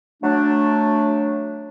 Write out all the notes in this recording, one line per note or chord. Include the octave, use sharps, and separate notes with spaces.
F#3 A3 D4